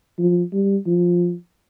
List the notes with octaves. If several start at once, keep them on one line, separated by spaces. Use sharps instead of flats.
F3
G3
F3